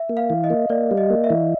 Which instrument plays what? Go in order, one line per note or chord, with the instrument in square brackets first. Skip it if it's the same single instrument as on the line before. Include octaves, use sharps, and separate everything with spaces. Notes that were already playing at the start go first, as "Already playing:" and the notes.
Already playing: [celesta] E5
[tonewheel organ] A#3
[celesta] F5
[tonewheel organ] E3
[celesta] D#5
[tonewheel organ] A#3
[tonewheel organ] A#3 [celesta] D5
[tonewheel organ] G3
[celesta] D#5
[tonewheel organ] A#3
[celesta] E5
[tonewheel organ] E3